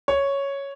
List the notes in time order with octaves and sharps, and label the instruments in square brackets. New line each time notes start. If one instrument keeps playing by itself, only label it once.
[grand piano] C#5